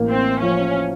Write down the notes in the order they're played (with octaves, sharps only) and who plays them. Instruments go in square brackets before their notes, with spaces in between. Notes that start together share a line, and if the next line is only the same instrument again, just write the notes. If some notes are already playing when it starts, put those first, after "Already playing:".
Already playing: [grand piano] A1 A#3
[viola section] C4
[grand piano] F3 [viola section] C#4